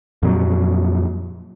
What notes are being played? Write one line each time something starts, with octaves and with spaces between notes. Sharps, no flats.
F2 A#2 F#3